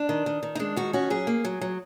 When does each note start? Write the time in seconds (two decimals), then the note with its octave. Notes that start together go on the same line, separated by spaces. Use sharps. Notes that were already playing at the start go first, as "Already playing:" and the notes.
Already playing: D4
0.09 D#3
0.26 D#3
0.43 D#3
0.55 D#4
0.59 G#3 D4
0.76 D#3 F#4
0.93 C#4 F#4
1.10 F#3 G#4
1.27 A#3
1.45 F#3
1.61 F#3